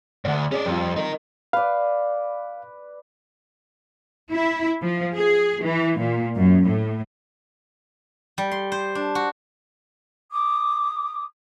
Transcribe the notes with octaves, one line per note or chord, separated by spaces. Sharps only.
D2 G#2 D5 F#5
C#4 G#4 D5
F2 G3 C4 F4
D#4 A#4
B4 D5 F5
E4
F3
G#4
E3
A#2
F#2
A2
G3
C6
C5
D4
F#4
D6 D#6